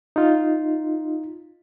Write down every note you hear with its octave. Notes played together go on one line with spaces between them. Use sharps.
D#4 F4